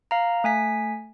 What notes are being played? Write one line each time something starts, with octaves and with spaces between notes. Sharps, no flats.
F5 A#5
A3 G#5 B6